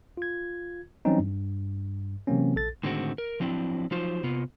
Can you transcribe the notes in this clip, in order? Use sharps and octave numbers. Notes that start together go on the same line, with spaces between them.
F4 G#6
E3 F#3 G3 C4 C#4 D#4
G2
C3 E3 F#3 A#3 C4 C#4
A#1 A4 A6
A2 D3 D#3 G#3 C4 F#4
A#4
F3 F#3 C4 D4 E4
F3 F#3 D#4 F4 C5
C3 B3 F4